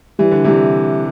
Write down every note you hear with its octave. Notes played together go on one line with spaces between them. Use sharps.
E3 G3
D3
C3 E3 G3